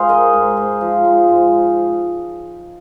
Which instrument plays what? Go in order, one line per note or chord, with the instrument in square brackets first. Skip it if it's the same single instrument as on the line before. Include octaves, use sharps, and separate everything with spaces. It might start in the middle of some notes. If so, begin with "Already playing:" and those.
Already playing: [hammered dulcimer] G#2 F4 G#4 C5 F5 G#5
G#3 A#4 D#5
G#2
G#2
F3
G#3
G#2